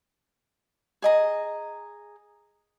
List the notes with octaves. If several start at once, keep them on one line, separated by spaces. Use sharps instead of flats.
G#4 D#5 A#5